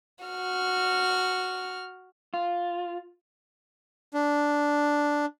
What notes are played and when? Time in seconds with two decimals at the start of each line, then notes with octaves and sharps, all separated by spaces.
0.24 F#4 F6
2.34 F4
4.14 D4